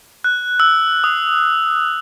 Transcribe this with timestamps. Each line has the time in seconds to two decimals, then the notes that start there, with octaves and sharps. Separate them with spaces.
0.24 F#6
0.60 E6
1.04 D#6